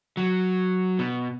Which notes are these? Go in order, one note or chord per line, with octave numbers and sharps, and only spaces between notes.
F#3
B2